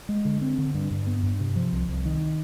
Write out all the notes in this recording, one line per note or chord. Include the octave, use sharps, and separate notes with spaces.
G#3
D3
C4
D3
G2
G2
B3
G2
C3
F3
C2
C2
D#3